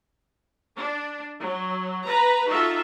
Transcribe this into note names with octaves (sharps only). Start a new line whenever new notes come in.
D4
F#3
B4 A#5
D#4 F4 F#4 A4 E5